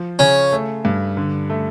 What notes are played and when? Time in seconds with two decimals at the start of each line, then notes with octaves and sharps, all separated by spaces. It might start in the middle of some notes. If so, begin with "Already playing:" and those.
Already playing: F3
0.19 C#3 C#4
0.52 A3
0.85 G2
1.17 D3
1.50 A3